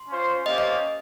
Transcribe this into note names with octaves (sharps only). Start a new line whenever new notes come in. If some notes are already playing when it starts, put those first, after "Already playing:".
Already playing: C6
C#4 F4 C5
A#3 C#4 G4 C5 D#5 F5
D#5